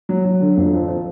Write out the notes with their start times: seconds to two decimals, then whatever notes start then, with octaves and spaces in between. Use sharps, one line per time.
0.09 F#3
0.25 F#3
0.41 D3
0.57 F2
0.73 F3
0.88 F3